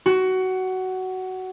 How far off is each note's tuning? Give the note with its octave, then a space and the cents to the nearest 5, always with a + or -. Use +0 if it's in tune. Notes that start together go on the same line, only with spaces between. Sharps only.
F#4 +15